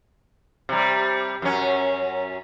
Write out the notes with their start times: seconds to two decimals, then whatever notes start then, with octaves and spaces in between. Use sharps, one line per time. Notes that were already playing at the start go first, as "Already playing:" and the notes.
0.69 C3 G3
1.42 F#2 C#4